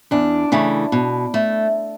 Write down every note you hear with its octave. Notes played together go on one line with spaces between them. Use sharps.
E2 D4
C#3 E3 A3
B2
A3